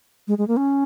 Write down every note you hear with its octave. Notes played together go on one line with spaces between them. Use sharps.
G#3
G#3
A#3
C#4